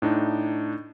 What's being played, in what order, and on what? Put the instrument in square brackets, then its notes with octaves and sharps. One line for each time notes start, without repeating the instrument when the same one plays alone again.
[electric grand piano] A2 D4 D#4